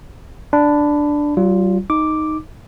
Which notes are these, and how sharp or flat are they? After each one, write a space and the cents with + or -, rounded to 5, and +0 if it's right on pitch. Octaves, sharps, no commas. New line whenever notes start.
D4 +0 B5 +15
G3 -45 F4 +0
D#4 +0 D6 +0